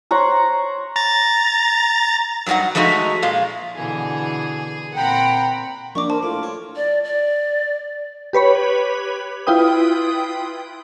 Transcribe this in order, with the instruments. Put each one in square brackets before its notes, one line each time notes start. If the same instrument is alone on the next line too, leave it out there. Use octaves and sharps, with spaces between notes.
[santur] C5 C#5 F#5 A#5
[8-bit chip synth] A#5 A6
[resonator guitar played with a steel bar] G2 F#3 G3 D#4 F#5
F3 G#3 A3 D#4 F#4
A#2 G#3 F4
[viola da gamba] B2 D3 E3 [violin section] G#4
[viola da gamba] A#2 C4 [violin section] F#5 A#5 B5 [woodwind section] G5
[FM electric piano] F3 D4 [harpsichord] A#3 [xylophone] C#6 D6
[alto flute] A#4 [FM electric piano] C5 [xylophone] A5
[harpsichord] A2 [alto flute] F4 [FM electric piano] D6
[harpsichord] C#5
[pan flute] D5
D5
[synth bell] G4 B4 C#5 B5
E4 F4 B4 G5 D#6